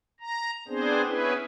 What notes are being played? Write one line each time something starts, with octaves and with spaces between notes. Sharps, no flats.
A#5
B3 C4 D4 G#4 C5
B3 C#4 E4 G#4 B4